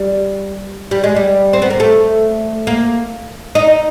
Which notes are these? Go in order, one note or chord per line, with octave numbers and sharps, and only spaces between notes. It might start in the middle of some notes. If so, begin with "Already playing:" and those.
Already playing: G3
G3
G#3
G3
C4
B3
A#3
A3
A#3
D#4